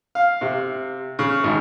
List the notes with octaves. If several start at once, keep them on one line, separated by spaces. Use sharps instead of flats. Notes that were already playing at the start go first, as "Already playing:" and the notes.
F5
C3
C#3
G#1